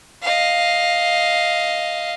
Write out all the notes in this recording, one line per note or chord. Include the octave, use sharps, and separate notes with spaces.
D#5 F5